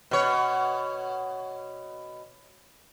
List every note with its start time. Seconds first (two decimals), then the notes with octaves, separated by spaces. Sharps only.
0.11 B2 C#5